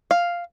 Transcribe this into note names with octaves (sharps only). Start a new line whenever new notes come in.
F5